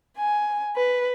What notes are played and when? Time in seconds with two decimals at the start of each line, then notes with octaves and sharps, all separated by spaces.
0.17 G#5
0.76 B4